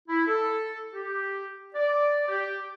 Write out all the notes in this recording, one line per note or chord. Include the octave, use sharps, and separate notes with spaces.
E4
A4
G4
D5
G4